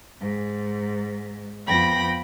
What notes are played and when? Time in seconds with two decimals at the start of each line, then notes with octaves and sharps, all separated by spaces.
0.21 G#2
1.67 F2 B3 G5 B5 A#6